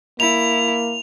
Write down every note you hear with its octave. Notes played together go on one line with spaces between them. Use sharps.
A#3 E4 F7